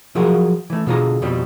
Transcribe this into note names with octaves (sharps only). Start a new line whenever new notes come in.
F3 F#3 F4 F#4 G#4 A#4
E3 A3
B2 D3 F4 G#4 A#5
F2 B2 F3 G3 C4